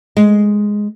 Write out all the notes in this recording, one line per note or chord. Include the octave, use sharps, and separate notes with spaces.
G#3